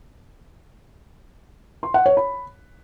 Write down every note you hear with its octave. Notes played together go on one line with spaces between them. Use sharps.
C6
F#5
C#5
B5